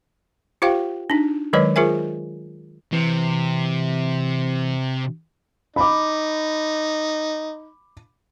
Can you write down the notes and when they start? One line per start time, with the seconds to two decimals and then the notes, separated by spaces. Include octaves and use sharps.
0.62 F4 G4 C5 F5 G5
1.10 D4 D#4
1.53 D#3 F#3 G#3 B4 C#5 D#5
1.76 F4 G#4 A#4 C5 E5 G#5
2.93 C3 E3
5.76 D#4 B5 D6